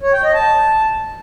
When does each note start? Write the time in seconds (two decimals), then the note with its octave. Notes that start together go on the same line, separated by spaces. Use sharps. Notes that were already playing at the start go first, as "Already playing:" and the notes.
0.02 C#5
0.13 G5
0.24 D#5
0.34 A5